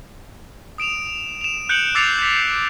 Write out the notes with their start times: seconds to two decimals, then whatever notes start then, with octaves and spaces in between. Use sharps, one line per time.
0.78 D#6 D7 E7 F7
1.41 E7 F7
1.69 F#6 G6 C#7 D7 F#7
1.95 D6 E6 A6 C7 C#7 F7
2.19 G6 B6